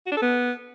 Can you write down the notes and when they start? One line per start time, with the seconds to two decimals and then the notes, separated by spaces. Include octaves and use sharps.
0.06 F#4
0.12 D4
0.17 A4
0.22 B3